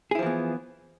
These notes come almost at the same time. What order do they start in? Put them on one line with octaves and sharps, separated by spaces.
G#4 E4 F3 E3 B3